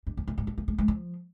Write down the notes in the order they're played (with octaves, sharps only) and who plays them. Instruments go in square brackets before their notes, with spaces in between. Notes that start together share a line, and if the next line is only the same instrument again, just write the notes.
[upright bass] G2
F2
G#2
G#2
G3
G3
G#3
G#3
F3